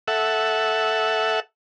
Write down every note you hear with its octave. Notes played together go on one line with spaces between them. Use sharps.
A4 E5 F#5